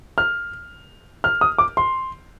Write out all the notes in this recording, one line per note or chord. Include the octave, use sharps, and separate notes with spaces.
F6
F6
D#6
D6
C6